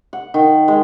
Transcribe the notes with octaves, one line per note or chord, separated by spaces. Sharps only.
F#5
D#3
G#3